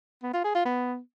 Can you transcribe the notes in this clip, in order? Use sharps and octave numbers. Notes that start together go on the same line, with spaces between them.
B3
F4
G#4
F4
B3